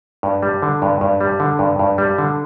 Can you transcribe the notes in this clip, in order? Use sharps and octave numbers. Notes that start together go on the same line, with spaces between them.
G2
G3
D3
G2
G2
G3
D3
G2
G2
G3
D3